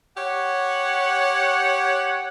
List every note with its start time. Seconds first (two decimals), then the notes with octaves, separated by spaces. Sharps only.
0.17 G4 C#5 F#5